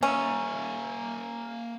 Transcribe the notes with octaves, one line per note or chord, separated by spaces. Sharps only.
A#3 C#4 E5